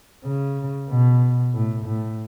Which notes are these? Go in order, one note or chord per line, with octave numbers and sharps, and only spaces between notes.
C#3
B2
A2
A2